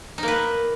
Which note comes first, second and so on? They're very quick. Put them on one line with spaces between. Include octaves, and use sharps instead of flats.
D#4 A#3 B4